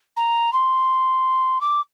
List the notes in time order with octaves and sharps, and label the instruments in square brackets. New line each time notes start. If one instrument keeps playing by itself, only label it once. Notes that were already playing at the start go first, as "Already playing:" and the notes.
[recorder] A#5
C6
D6